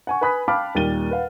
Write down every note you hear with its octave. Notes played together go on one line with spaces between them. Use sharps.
F#5 G#5 C#6
B4 G#5 B5 D#6 F#6 B6
F5 G5 A5 B5 D6 F6
D#2 A#2 G3 A6 D#7 G7
B4 F5 F#5